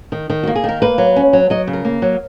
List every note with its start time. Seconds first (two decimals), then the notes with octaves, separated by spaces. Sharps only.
0.12 D#3
0.30 D#3
0.43 A#3 F#4
0.55 G#4
0.64 D#3 A#4
0.82 A#3 B4
0.98 F#3
1.16 C#4
1.33 F#3
1.50 F#3 D#5
1.67 C#3
1.73 A#4
1.85 A#3
2.02 F#3